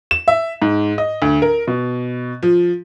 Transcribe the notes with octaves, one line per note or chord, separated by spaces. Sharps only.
E7
E5
G#2
D#5
D2
A#4
B2
F3